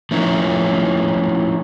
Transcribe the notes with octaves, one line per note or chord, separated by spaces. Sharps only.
F3 A3 C#4 D#4 E4